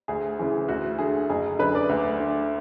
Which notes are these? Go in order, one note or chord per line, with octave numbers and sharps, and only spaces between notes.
D2 G#4
C#3 E3 G#4
D2 F#4
D3 G#4
F#1 G#4
F#2 D3 B4
D5
D2
D3